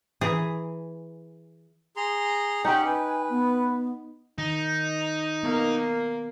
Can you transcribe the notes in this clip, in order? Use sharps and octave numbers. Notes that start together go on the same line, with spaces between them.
E3 G#4 A#5
G#4 A#5 C6
C#4 D#4 G4 F#5 G5
B4 G#5
B3
D#3 D#4
A#3 B3